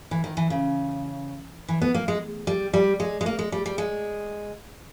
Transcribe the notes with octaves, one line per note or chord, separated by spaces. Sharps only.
E3
D#3
E3
C#3
E3
B3
A#3
G#3
G3
G3
G#3
G#3
A#3
G#3
G3
G3
G#3